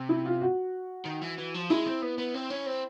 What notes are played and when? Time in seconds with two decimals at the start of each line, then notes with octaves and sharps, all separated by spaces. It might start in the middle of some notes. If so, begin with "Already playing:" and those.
Already playing: C3
0.09 E4
0.26 F4
0.41 F#4
1.05 D#3
1.22 E3
1.38 E3
1.54 F3
1.70 G#3 E4
1.86 C4
2.02 B3
2.18 B3
2.34 C4
2.50 C#4
2.66 C4